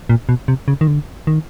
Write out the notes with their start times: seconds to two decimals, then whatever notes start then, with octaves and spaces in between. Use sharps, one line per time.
0.09 A#2
0.29 B2
0.48 C3
0.68 C#3
0.81 D#3
0.87 D3
1.27 D#3